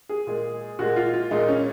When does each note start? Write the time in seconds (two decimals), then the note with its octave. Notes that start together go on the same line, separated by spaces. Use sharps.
0.09 G#4
0.27 A#2 G#3
0.79 A#2 G#3 F#4
0.96 F4
1.14 F4
1.31 A#2 G#3 D#4
1.48 C#4